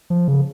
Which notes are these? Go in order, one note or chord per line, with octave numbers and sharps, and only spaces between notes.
F3
C#3